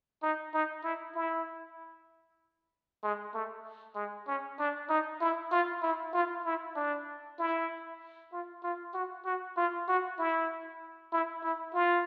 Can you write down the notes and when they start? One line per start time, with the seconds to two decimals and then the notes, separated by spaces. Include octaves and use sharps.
0.22 D#4
0.54 D#4
0.84 E4
1.15 E4
3.03 G#3
3.34 A3
3.95 G#3
4.27 C#4
4.59 D4
4.89 D#4
5.21 E4
5.51 F4
5.82 E4
6.13 F4
6.45 E4
6.76 D4
7.38 E4
8.32 F4
8.63 F4
8.94 F#4
9.25 F#4
9.57 F4
9.88 F#4
10.19 E4
11.12 E4
11.43 E4
11.74 F4